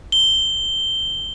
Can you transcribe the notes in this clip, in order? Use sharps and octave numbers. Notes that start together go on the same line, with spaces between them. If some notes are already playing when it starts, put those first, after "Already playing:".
G7